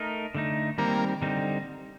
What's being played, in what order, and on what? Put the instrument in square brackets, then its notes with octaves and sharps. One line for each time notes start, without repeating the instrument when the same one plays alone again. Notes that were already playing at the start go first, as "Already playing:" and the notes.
Already playing: [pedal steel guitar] A3 D#4 A#4
D3 A3 D#4
[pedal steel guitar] D#3 G3 C4 [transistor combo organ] A#3
[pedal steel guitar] D3 G3 C4 D#4